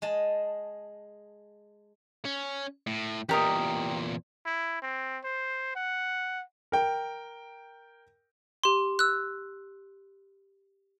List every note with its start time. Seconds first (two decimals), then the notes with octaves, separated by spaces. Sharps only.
0.02 G#3 D#5 A5
2.25 C#4
2.87 A2
3.29 E2 A#2 G4 A#4 D#5
4.46 E4
4.82 C4
5.24 C5
5.76 F#5
6.72 A#4 G5
8.64 G4 C6
8.99 E6 F#6